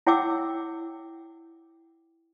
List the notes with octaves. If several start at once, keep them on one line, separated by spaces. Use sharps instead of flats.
E4 C#5 F#5 G5 D6 E6